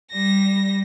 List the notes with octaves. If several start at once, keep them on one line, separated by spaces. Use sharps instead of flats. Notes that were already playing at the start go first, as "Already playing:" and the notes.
G3 A#6